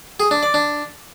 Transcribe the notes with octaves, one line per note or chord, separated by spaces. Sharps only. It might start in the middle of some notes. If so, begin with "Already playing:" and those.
G#4
D4
D5
D4